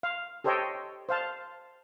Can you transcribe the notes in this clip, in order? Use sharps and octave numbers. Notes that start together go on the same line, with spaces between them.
F5
G4 A4 C5 C#5 D#5 G5
C5 F5 A5